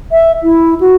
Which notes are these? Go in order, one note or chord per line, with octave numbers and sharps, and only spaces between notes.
E5
E4
F#4